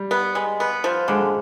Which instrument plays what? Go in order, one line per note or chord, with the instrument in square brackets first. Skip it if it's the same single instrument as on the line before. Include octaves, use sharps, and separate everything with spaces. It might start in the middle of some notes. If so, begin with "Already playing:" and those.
Already playing: [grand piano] G3
[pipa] B3
G#3
B3
F3
[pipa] D3 [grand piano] G#3
[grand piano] G#3